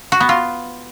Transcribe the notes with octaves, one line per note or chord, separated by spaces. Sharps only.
F#4
B3
F4